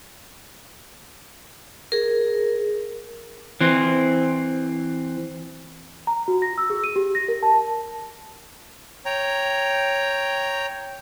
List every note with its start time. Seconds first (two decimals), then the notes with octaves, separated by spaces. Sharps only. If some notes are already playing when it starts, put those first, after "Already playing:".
1.92 G#4 A#4
3.61 E3 C4
6.07 A#5
6.28 F#4
6.42 A#6
6.58 E6
6.70 G#4
6.84 D#7
6.96 G4
7.15 A#6
7.28 A#4
7.43 A5
9.06 C#5 G5 A#5